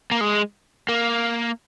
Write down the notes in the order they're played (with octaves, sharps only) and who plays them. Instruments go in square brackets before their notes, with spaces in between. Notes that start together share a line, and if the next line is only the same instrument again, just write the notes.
[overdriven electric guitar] A#3
G#3
A#3